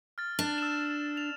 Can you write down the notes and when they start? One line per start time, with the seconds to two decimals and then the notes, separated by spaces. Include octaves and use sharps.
0.18 F6 A6
0.39 D4
0.58 E6 E7
1.17 F7